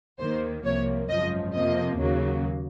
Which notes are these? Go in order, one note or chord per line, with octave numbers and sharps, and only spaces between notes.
D#2 D#3 A#3 C5
C2 C3 F3 A#3 C#5
G#1 F#2 C#3 F3 D#5
F2 C3 F3 A#3 D#5
D#2 C#3 F#3 A#3